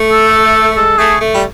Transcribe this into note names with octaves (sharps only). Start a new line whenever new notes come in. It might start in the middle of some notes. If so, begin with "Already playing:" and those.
Already playing: A3
A4
G#3 A4
A3 G#4
A3
G3